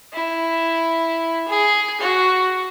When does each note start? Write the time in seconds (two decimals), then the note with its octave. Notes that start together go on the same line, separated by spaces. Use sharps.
0.13 E4
1.48 G#4
2.01 F#4